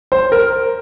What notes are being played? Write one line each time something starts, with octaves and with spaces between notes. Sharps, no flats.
C5
A#4